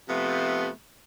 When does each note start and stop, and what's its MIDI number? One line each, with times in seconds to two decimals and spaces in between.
0.09 0.69 48
0.09 0.69 53
0.09 0.69 57
0.09 0.69 59